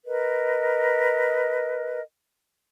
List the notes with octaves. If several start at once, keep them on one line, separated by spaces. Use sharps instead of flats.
A#4 B4 D#5